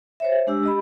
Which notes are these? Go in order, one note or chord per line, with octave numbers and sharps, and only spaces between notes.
C5 C#5 E5
G#3 D4 G4 E6
G4 D#5 B5